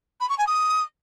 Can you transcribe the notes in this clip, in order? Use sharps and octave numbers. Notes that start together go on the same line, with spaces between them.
B5
C#6
G#5
D#6